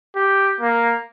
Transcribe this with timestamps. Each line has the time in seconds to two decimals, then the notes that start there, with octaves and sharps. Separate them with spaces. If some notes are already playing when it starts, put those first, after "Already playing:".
0.16 G4
0.61 A#3